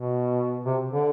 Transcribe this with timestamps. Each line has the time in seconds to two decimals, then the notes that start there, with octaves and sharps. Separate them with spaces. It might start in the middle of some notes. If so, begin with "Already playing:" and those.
Already playing: B2
0.66 C3
0.91 D3